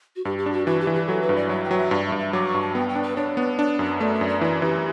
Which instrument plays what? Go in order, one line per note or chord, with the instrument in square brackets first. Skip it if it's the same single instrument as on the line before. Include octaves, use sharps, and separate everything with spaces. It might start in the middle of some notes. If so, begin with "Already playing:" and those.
[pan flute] F#4
[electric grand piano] G2 [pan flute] G4
[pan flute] G4
[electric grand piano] D4
[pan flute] F#4
[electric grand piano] E3 [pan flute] F#4
[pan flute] G4
[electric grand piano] E3
[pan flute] G4
[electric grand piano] F#3 [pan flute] A4
[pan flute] B4
[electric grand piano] G2
[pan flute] D5
[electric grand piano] F#3 [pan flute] E5
[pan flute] G5
[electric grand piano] F#3
[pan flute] E5
[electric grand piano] G2 [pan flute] D5
[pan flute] E5
[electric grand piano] G2
[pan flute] E5
[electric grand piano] F#3 [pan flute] D6
[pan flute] C#6
[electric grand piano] G2
[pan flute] A5
[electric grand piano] B3 [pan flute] G5
[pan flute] G5
[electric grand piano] D4
[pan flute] B4
[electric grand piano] D4 [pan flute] C#5
[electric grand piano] B3
D4
F#2
[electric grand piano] A3 [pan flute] D5
[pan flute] E5
[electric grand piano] F#2
[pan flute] D5
[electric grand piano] E3 [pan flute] D5
[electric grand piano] E3 [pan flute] G4